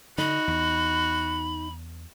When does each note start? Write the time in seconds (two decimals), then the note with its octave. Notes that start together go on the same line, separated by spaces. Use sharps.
0.18 D3 D#4 F#4 B5
0.48 E2